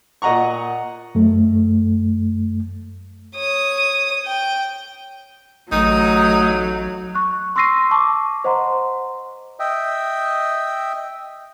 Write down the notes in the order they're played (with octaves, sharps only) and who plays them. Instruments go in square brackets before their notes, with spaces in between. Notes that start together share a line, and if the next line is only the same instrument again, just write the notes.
[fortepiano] A#2 D#5 F#5 A#5 C#6
[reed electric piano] F#2 A3
[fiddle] C#5 D#6
G5
[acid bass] A1 [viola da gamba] F#3 [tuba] A3 [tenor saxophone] D#4
[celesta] C#6 F#6
C6 C#6 E6 A#6 C7 D#7
A5 C#6 D6
C5 D#5 F#5 A#5 C6
[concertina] D#5 E5 G5